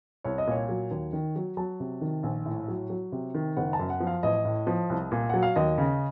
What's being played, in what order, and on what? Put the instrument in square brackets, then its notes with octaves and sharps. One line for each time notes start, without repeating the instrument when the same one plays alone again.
[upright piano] C2 C#5
D#5
A#2 C#5
F#3
D#2
D#3
F#3
F#3 A5
C3
D#3
A#1
A2
F#3
F#3
C3
D#3
F#1 F#5
A5
F#2
F#5
F3
F5
A1 D#5
A2
F3
C2
A#2
F#3 F#5
F5
D#2 D#5
C#3